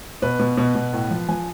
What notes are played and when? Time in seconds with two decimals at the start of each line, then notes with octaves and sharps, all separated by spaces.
0.22 B2 B4
0.39 B2
0.57 B2
0.75 B2
0.93 A2
1.11 F3
1.29 F3 G#5